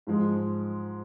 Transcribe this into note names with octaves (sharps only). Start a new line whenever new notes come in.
G#2 F3 G#3